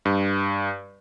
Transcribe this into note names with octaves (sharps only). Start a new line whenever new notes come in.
G2